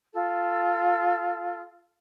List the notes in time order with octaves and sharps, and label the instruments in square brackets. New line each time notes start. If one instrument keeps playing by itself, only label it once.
[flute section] F4 A4